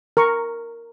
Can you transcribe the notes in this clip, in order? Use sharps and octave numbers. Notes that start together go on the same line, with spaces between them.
A#4 A#5 C#6